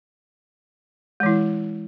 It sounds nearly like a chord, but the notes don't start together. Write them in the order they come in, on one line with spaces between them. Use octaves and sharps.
G#3 E3 E4